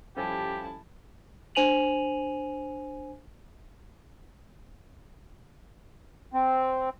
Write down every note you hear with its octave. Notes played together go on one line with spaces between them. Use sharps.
F3 G3 C#4 E4 G4 A4 G#5 A5
D4 C5 G#5 D#7 F7 F#7
C4